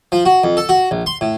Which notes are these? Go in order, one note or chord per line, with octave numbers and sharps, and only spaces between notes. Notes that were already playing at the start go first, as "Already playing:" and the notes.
F3
F#4
F2
A4
F#4
A#1
C6
A2